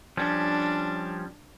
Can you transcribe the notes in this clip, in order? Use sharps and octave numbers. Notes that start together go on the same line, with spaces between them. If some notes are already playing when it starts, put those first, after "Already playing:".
F3 G3 C#4 D4